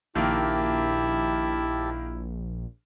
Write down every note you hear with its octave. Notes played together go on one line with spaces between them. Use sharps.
A#1 D#3 A#3 E4 G4 E5 A5